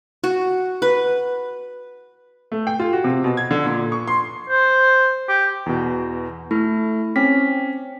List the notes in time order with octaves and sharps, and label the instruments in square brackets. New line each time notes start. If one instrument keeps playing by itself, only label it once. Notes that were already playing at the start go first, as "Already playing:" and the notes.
[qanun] F#4
B4
[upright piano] A3
G5
F4
F#4
C3
B2
G#6
D3
A#2
C#6
C6
[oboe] C5
G4
[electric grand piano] E2 B2
[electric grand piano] A3 [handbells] E4
[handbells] C4 B6 [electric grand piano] C#4